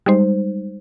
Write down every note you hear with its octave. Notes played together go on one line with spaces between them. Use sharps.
G3 G#3 D#4 C5